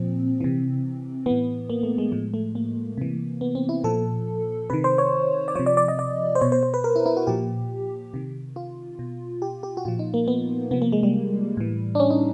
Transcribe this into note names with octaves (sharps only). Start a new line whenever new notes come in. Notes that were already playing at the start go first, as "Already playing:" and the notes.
Already playing: A#2 F3 C4
C3 E3
A2 E3 B3
A#3
A3
G#3
A2 F3 G#3
A3
A#3
C3 E3
B3
C4
E4
A#2 F3 A4
C3 D#3 B4
C5
C#5
D5
C3 F3 C#5
D5
D5
D#5
D5
C5
B2 C#5
C5
C5
B4
A#4
E4
E4
F#4
A#2 F3 G4
C3 D#3
F4
B2
G4
G4
F#4
A#2 F3 F4
D#4
A#3
B3
C3 F3 B3
A#3
G#3
G3
A2 E3
D4
C#4
D#4